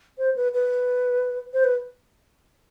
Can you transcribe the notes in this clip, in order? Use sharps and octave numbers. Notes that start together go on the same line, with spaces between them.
C5
B4
B4
C5
B4